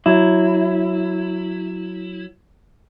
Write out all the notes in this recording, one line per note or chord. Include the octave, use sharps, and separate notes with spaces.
F#3 E4